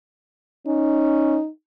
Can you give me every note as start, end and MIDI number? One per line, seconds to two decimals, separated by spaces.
0.67 1.39 61
0.67 1.49 63